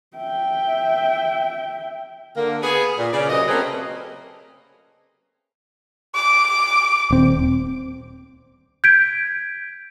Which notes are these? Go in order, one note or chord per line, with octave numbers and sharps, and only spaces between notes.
E5 G5
D3 A#3
B3 G#4
A#2
C#3 C#4 D5
F#2 C3 D#5
A3 A#3 C4 C#4 G#4 B4
D6
D#1 C4
G6 G#6 B6 D7